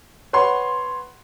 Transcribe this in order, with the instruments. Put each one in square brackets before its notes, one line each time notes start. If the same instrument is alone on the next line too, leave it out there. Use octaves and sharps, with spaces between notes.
[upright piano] B4 C#5 F#5 C6